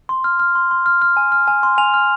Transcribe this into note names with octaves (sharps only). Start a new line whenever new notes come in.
C6
F6
F6
C6
C6
F6
F6
G#5
F6
G#5
C6
G#5 F7
F6